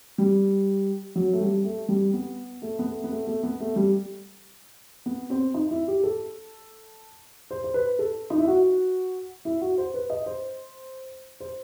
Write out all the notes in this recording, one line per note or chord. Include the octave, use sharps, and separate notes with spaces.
G3
F#3
A3
G3
A3
G3
B3
A3
B3
A3
B3
A3
A3
B3
A3
G3
B3
C4
D#4
E4
G4
A4
C5
C5
B4
A4
D#4
E4
F#4
E4
F#4
C5
B4
D#5
C5
C5